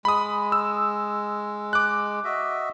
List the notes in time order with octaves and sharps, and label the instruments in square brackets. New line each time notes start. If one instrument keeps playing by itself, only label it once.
[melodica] G#3 [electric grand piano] B5 D#6
[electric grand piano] E6
D6 F#6
[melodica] F#4 D#5 E5